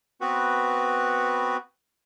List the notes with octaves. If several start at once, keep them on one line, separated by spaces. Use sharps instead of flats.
B3 C4 F#4 B4